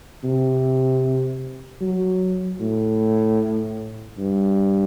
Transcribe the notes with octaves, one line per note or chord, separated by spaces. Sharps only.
C3
F#3
A2
G2